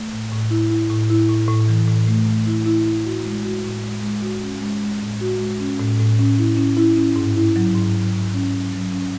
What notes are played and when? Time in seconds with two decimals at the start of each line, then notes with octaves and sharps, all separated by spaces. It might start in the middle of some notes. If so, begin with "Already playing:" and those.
Already playing: A3
0.12 A2
0.32 A2
0.50 E4
0.70 E4
0.90 A2
1.10 E4
1.29 A2
1.48 A2
1.68 E3
1.88 A2
2.07 A3
2.27 A3
2.46 E4
2.66 E4
2.86 E4
3.05 F#4
3.25 G#3
3.45 F#4
3.64 A2
3.84 G#3
4.03 G#3
4.22 F#4
4.42 C#4
4.62 G#3
4.82 G#3
5.01 A2
5.21 F#4
5.40 G#3
5.60 C#4
5.80 A2
5.99 A2
6.19 C#4
6.39 E4
6.57 C#4
6.77 E4
6.97 C#4
7.16 G#2
7.36 E4
7.56 F#3
7.75 G#2
7.95 F#3
8.14 G#2
8.34 C#4
8.53 F#3
8.73 F#3
8.93 C#4